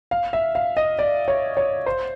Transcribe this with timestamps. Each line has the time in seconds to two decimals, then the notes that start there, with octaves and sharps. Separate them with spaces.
0.11 F5
0.33 E5
0.55 F5
0.77 D#5
0.99 D5
1.28 C#5
1.57 C#5
1.86 C5